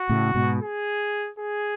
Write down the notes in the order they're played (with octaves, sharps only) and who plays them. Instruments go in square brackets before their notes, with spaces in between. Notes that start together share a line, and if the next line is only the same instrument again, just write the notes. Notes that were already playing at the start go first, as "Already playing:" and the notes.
Already playing: [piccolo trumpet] F#4
[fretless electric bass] A2 C#3
G#2 B2
[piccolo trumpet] G#4
G#4